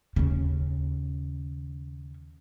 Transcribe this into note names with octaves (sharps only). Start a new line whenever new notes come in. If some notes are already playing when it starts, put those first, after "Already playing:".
D#2 C#3